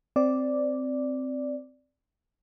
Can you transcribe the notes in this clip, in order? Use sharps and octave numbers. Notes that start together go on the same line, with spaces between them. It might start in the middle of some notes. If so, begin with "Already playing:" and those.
C4 D5